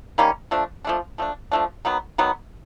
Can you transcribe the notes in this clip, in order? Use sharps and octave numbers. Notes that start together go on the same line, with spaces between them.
D#3 G3 A#3 C#4
F3 A3 D4
F3 A3 D4
F3 A3 D4
F3 A3 D4
D#3 F#3 B3
D#3 F#3 B3